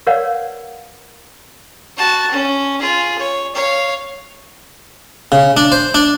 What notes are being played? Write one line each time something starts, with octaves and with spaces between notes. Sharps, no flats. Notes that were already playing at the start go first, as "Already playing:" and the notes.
A#4 B4 C#5 D5 F5 F#5
F#4 A5
C#4
F4 G#4
C#5
C#5 F5
C#3
D4
C5
D4